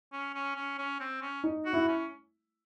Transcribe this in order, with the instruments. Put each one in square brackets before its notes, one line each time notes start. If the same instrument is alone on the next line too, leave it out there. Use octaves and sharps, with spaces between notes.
[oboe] C#4
C#4
C#4
C#4
C4
C#4
[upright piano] D#4
[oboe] F#4
[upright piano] E4
[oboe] C#4